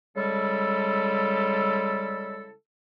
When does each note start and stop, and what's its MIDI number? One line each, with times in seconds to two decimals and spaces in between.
0.16 2.51 49
0.16 2.51 55
0.16 2.51 56
0.16 2.51 64
0.16 2.51 69